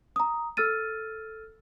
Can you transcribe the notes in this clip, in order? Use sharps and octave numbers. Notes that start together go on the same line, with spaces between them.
A#5 D#6
A4 E6 F6 A6 D#7